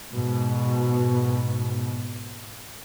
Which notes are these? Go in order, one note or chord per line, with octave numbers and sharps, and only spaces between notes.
G#2 B2